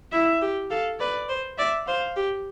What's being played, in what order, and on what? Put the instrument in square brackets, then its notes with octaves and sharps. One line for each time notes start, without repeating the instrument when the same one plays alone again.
[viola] E4 [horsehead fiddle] E5
[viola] G4
[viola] A4 [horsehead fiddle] F5
[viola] B4 [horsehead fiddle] D5
[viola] C5
[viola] D5 [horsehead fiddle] E5
[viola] C5 [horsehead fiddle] F5
[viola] G4